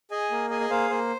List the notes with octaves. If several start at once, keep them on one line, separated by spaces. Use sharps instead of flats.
G#4 D#5 G#5
A#3
G#4 D#5 G#5
D#5
A#3 C5 F5
A#3 C5